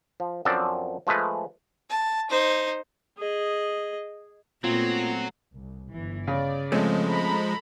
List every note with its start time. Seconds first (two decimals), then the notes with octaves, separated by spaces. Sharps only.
0.20 F3
0.45 F#2 F3 C4 D4 A4 D5
1.07 F3 G#3 A3 B4
1.90 A5
2.30 D#4 C5
3.18 G#4 D#5
4.64 A#2 F#3 A3 B3 C4 F4
5.53 C2
5.93 G1 E3
6.27 C#3 D5
6.72 F3 G#3 A3 C4 C#4
7.09 A4 A#5 B5